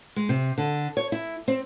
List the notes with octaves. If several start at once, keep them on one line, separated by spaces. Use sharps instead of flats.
G#3
C3
D3
C#5
E4
C4